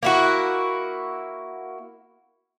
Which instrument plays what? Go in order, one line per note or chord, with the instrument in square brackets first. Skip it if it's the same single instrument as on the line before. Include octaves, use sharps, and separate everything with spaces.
[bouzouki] A#3 E4 F#4